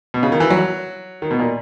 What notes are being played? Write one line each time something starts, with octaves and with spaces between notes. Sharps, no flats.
B2
C#3
D#3
E3
F#3
D#3
B2
A#2